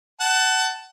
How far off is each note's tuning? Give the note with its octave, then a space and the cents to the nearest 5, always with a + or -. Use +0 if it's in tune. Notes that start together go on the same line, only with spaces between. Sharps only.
F#5 +25 A5 +0